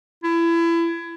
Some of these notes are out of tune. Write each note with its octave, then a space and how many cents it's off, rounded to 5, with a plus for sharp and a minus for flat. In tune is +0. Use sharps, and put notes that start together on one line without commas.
E4 +30